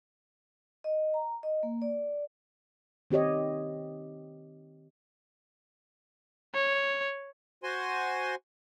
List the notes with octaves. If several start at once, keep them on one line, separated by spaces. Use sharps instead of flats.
D#5
A#5
D#5
A#3
D5
D#3 C4 G4 C#5 D#5
C#5
F#4 C5 G#5 C6